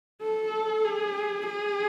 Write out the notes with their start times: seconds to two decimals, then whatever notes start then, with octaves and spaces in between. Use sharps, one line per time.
0.22 A4
0.84 G#4
1.46 G#4